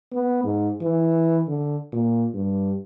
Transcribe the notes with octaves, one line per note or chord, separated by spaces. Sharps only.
B3
G#2
E3
D3
A#2
G2